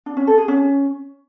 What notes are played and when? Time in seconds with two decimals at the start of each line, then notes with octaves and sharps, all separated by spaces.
0.06 D4
0.17 C#4
0.27 A4
0.38 G#4
0.48 C#4